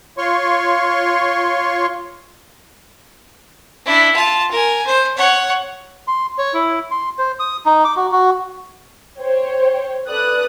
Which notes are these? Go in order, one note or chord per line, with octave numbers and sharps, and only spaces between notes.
F4 C#5 C6 C#6
D4 E4
F4 A5
A#4 G#5
C5
C#5 F#5
C6
C#5
E4
C6
C5
D#6
D#4
D6
F#4
F#4
C5 C#5 G5
A4 B4 D5 D#6 F#6